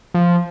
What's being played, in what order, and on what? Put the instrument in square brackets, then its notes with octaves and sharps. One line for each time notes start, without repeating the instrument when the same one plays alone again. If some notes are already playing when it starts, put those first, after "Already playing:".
[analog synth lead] F3